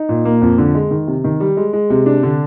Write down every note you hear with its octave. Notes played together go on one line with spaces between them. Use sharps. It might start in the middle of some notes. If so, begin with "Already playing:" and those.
Already playing: D#4
A#2
A#3
F2
D3
G#3
D#3
C3
D#3
G3
G#3
G#3
C3
D4
D3